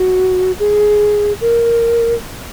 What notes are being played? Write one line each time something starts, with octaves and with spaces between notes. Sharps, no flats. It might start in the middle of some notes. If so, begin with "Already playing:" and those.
Already playing: F#4
G#4
A#4